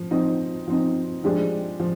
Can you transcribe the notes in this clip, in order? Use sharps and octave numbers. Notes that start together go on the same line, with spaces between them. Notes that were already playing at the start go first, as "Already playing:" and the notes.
Already playing: F3
F3 C4 D#4
F3 C4 D#4
F3 G#3 D4 G4
F3